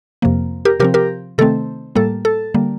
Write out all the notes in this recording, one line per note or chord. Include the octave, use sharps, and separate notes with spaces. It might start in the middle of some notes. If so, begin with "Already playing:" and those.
F2 C3 F3 A#3
G4 A#4
C3 F3 C4 G4 A#4
G4 A#4
C3 D#3 A3 C4 A4
A2 G3 A#3 A4
A4
D3 G3 A#3